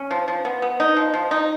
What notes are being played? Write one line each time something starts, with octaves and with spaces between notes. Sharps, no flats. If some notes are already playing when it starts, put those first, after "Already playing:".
Already playing: C#4
F3
F3
B3
B3
D#4
F3
F3
D#4